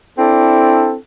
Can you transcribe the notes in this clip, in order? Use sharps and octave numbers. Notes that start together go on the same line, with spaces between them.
C4 D4 E4 A4